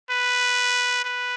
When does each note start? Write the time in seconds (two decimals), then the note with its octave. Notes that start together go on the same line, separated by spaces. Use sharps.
0.10 B4
1.05 B4